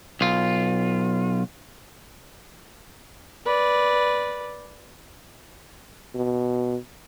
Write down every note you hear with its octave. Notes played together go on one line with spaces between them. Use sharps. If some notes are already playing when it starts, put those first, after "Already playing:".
B1 F4
B4 D5
B2